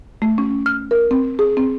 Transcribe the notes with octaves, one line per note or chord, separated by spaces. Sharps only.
A3
C#4
F6
A#4
C4
G#4
C4